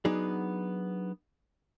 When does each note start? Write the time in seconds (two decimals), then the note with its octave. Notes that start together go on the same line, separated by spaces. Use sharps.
0.05 F#3 B3 D4 D#4 G#4